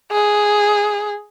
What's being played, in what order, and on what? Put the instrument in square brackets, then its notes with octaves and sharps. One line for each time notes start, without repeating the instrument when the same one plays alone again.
[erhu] G#4